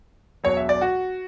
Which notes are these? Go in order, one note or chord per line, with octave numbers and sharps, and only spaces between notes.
E1 E2 B2 F#3 C#5
E5
D5
F#4